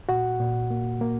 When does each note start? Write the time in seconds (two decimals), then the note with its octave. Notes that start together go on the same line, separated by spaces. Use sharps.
0.09 A#2 F#4 F#5
0.40 A#2
0.71 A#3
1.01 A#3